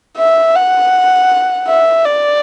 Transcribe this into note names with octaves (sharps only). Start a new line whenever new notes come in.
E5
F#5
E5
D5